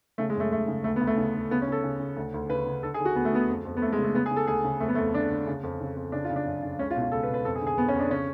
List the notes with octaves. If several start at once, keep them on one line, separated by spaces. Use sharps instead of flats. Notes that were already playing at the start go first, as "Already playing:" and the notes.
C#3 A3
G#3
F#2 A3
F#2 A3
C#3
D2 A3
B3
D2
A3
C#3
D2
C#3 B3
C#4
C#3 A4
C#3
C#3
D2
D2
C#3 B4
C#3
D3 A4
G#4
D3
F#4
D2 B3
A3
D3 B3
F2
F2
B3
F2 A3
G#3
C#3
A3
C#3 B3
G#4
C#3
A4
D2 G#4
C#3
F2 A3
B3
A3
F2
D3 D4
D3
C#3
F2
C#3
F2
C#3 D4
F4
C#3
D4
F#2
C#3
C#2 C#4
F4
B2
F4
C#2 A4
B4
B2
B4
F2 A4
G#4
D3
G#4
F2 B3
C#4
F2 D4
C#3 C#4